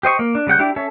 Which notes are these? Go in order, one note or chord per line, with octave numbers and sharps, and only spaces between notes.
G4 C5 D#5 C#6
A#3
D4
C#3 G3 F#5 G6
D4 E4 G4
C#4 A4 C#5 E5